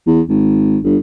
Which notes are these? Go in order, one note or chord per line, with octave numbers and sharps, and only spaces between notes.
E2
G#1
G1